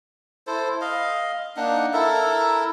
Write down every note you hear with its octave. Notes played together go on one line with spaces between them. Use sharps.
E4 A4 C5
D#5 F5
A#3 D4 D#4 F#5
E4 A4 A#4 E5